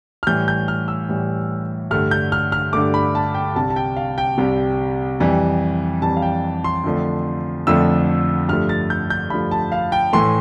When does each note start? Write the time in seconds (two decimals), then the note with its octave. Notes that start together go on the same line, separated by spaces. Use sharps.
0.23 F6
0.27 A2 E3 G3 G6
0.48 G6
0.68 F6
0.88 E6
1.09 A2 E3 G3
1.91 G2 D3 A3 F6
2.11 G6
2.32 F6
2.52 F6
2.73 G2 D3 A3 D6
2.94 B5
3.15 A5
3.34 G5
3.56 C2 C3 G3 A5
3.70 A5
3.76 G5
3.96 F5
4.18 G5
4.38 C2 C3 G3
5.20 F2 E3 G3
6.02 F2 E3 G3 A5
6.17 F5
6.22 G5
6.64 C6
6.84 F2 D3 F3 A3
7.67 F2 D3 F3 A3 E6
8.48 G2 F3 A3 F6
8.69 A6
8.90 G6
9.10 G6
9.30 G2 F3 A3 B5
9.51 A5
9.72 F5
9.92 G5
10.13 A2 E3 A3 C6